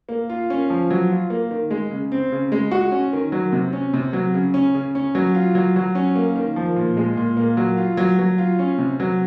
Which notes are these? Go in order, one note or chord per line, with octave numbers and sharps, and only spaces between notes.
A#3
F4
C#4
F3
F#3
F4
A#3
D#3
G#3
C#3
C4
C#3
G#3
F#4
C#4
D#3
F#3
C3
C#4
C3
F#3
C#3
C#4
C#3
C#4
F#3
F4
F#3
F#3
C#4
A#3
D#3
F3
A#2
G#3
A#2
A#3
F#3
F4
F#3
F#3
F4
C#4
C3
F#3